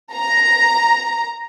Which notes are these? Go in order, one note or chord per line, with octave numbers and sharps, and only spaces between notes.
A#5